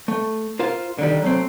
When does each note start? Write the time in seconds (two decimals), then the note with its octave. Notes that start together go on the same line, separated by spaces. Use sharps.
0.08 A3
0.59 F4 A#4 C5 F5
0.99 D3 D#3 G3
1.22 F#3 A3 C4